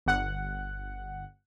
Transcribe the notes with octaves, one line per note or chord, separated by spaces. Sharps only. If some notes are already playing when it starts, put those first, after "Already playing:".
G1 F#5